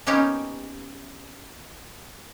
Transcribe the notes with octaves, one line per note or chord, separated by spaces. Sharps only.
A#3 B3 C#4 D#4 G4